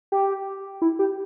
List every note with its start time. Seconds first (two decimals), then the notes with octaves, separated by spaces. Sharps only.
0.12 G4
0.82 E4
0.99 G4